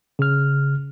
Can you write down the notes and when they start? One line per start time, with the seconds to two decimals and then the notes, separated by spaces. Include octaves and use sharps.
0.19 C#3 F6